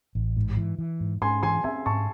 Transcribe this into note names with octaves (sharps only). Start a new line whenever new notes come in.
A1
G#2
E3
E3
G#2
G#2 G#5 C6
E3 G#5 C6
C4 E5 G#5
G#2 A5 C#6